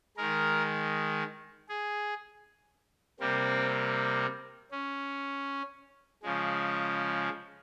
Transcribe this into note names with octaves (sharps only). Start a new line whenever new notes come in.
D#3 G#3 A#4
G#4
C3 G3 A#3 C4
C#4
C#3 F3 G#3